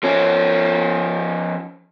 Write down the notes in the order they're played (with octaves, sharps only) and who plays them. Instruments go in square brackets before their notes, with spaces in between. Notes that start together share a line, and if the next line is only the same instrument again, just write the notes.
[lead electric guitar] F3 C#4